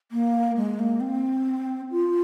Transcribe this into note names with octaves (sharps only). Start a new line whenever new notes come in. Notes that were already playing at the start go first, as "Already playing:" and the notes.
A#3
G#3
A#3
C4
F4